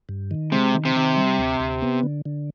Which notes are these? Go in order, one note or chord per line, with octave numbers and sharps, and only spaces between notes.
G2
D#3
C3 G#3
D#3
C3
D#3
G3
D2
D2
B3
D3
D3